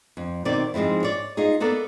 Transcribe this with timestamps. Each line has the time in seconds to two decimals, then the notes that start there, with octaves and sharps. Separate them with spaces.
0.17 F2
0.45 B2 D#3 C4 D5
0.74 G#2 F3 G#3 C4 E4
1.03 C#5 D5
1.37 D#4 F4 G#4
1.60 A#3 B3 A4 A#4 D5